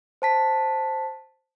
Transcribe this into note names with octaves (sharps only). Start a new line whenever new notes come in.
C5 A5 B6